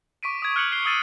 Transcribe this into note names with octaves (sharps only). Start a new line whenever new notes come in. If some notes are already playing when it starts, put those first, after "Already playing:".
C#6 D6 B6 D7 D#7
D#6 G#6
F6 F#6 G#6 C#7 F7 F#7
F#6 C7 G7
D#6 E6 G#6 A6 C7 D#7